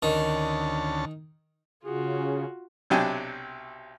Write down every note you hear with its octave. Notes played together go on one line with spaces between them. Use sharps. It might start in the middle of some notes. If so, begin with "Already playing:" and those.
D2 D#3 C#4 A5
C#3 F4 F#4 G#4
B1 C3 F#3 D4 G5 G#5